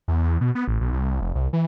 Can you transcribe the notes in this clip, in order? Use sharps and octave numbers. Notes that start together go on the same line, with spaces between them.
E2
E2
B2
B3
A1
B1
C2
F1
C2
E3